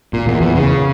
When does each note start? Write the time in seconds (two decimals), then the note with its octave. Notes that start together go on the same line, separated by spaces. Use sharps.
0.13 A#2
0.27 E2
0.41 E2
0.55 C#3